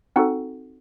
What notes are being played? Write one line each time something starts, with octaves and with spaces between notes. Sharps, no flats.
C4 D#4 F#4 A4 F#5